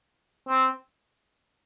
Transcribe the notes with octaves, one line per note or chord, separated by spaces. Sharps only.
C4